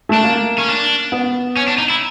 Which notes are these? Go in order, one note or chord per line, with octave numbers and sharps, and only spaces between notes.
A3 D4
A#3
C#4
D4
B3
C#4
D4
D#4
E4